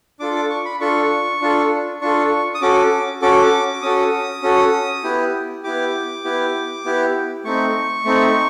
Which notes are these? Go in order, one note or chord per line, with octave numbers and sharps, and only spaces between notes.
D4 F4 A4 D6
D6
C#6
B5
D4 F4 A4 C#6
D4 F4 A4
D4 F4 A4 C#6
D#6
C#4 F#4 A4 D6
C#4 F#4 A4 D6
D6
C#4 F#4 A4 D#6
C#4 F#4 A4
B3 E4 G4
B3 E4 G4 D6
B3 E4 G4
B3 E4 G4
A3 C4 D#4 C#6
A3 C4 D#4